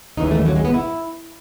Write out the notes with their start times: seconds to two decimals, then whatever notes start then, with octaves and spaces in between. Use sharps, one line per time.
0.17 D#2 C#3 E3 D#4
0.31 A3
0.45 F#3
0.56 G#3
0.65 B3
0.74 E4